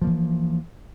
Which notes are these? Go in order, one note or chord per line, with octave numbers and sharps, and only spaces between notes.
E3 F3 A#3